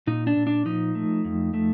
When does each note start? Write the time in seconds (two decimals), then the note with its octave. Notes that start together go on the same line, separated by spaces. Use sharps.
0.07 A#2 D#4
0.27 D4
0.37 A#2
0.47 D4
0.66 F3 D#4
0.95 A3
1.24 F2
1.54 A3